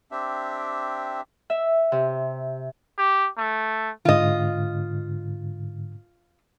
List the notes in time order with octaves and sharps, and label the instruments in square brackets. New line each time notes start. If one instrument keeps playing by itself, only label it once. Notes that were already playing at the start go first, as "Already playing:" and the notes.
[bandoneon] C4 D4 G4 E5
[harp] E5
C3
[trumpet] G4
A3
[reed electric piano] G#2 D3 [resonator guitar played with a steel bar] F4 D#5